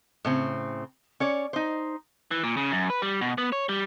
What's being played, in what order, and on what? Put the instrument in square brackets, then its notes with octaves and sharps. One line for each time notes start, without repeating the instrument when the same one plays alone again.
[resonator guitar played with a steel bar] A2 C#3 C4
C#4 C#5 D5
D#4 C5
[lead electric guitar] E3
A#2
C#3
F#2
B4
G3
B2
B3
C#5
G3